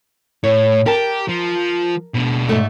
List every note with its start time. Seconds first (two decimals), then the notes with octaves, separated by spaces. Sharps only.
0.44 A2 C#5
0.86 G4 A#4 A5
1.29 F3
2.15 B2 D4
2.49 G#2 A3